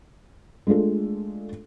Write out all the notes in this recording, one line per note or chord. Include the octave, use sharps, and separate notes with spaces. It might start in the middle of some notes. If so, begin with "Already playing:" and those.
G#3 A3 D4 F4 A4